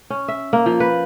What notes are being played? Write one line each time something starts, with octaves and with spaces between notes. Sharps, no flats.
C#4
E5
A#3
F3
B4